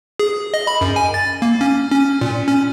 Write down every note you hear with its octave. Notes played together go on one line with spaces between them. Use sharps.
G#4
D#5
B5
F#2
G#5
A6
A#3
C#4
C#4
A#2
C#4